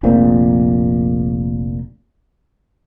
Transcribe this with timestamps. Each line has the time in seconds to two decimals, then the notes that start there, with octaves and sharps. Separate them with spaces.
0.03 F1 A#1 A#2 C4